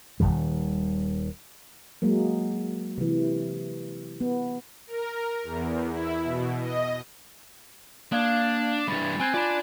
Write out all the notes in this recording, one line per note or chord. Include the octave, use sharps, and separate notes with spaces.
D#1 C#2 D#3 G3
F#3 G#3 A#3
C3 E3
B3
A#4
E2
E4
B2
D#5
A#3 D4 F5 G#6
G2 E3 B5 A6
C4 G#5 F#6 G#6
F4 D5 A5 B5